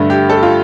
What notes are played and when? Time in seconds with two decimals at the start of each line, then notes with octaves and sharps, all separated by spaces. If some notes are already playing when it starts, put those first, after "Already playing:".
Already playing: G2 D3 A3
0.10 G4
0.30 A4
0.43 F4